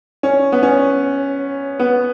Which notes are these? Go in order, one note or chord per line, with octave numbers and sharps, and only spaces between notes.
C#4
B3
C#4
B3